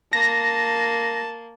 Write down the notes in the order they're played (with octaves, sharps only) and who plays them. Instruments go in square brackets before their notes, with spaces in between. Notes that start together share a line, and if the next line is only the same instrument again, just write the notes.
[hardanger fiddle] A#3 [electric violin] A5 [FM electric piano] A#6